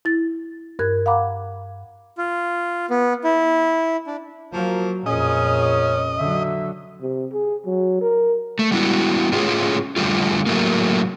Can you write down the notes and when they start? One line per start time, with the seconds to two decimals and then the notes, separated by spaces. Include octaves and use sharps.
0.05 E4 A6
0.79 G2 A#4 F#6 G#6
1.06 F5 F#5 A#5 B5 D6
2.18 F4
2.90 B3
3.24 E4
4.07 D4
4.53 F3 F#3 A#3 A#4
5.06 F2 A#2 C#4 G#4 D#5
6.18 D3 F#3 E5
7.01 C3
7.33 G#4
7.66 F#3
8.01 A#4
8.59 A3
8.72 G3 B3 E4 F#4
9.32 A2 A3 C#4 F4 G#4
9.96 F2 D3 G3 A3 F4
10.46 A2 F#3 A3 A#3